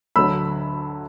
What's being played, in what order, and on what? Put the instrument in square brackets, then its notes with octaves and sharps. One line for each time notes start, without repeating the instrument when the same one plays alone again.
[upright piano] D2 D3 F#3 B5 E6